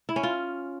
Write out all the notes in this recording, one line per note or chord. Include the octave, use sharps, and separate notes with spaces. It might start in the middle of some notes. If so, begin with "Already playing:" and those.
E4
C#4
F4